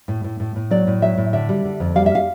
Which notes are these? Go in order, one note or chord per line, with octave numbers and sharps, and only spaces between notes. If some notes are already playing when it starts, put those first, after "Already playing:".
A2
A2
A2
A2
F#3 D5
A2
F#3 E5
A2
D3 E5
G3
D3
F2
G3 F5
E5
F5